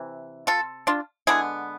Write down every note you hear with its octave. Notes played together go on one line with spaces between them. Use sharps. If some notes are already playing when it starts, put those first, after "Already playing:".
Already playing: C3 E3
F4 A4
D4 F4
D3 G#3 B3 E4 G#4